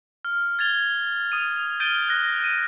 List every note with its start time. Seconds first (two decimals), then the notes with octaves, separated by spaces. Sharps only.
0.25 F6
0.59 G#6 A6 F7 G7
1.32 D#6 D#7
1.80 F6 G6 A6 D7 D#7 G7
2.09 F#6 A#6
2.44 D#7